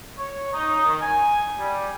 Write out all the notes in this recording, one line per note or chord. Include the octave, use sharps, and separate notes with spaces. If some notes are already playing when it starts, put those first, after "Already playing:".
C#5
D#4
D#3
G#5
G3